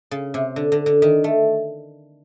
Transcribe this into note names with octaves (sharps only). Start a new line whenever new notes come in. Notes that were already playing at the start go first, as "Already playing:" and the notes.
C#3
C3
D3
D3
D3
D#3
A3